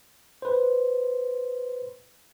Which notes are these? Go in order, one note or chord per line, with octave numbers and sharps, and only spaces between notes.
B4 C5